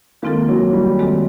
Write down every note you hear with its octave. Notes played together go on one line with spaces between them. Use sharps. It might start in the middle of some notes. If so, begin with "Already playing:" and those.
D#3 G#3 A#3 C4 F4 A4
F#3
G3
D#3 G#3 C4 F4 A4